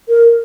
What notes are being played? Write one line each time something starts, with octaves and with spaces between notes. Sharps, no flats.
A#4